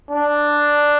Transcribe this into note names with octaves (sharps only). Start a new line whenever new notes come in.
D4